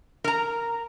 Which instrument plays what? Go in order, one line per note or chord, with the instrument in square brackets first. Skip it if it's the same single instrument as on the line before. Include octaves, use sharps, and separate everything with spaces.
[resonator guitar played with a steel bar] A#4 A#5